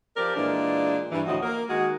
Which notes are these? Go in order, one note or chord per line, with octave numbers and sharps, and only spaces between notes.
F3 C4 G4 A#4 D5
A#2 E3 G#3 D4 F4
G2 E3
D2 A2 F3 F#4 D#5
A#3 A#4
D#3 G#3 A#3 F#4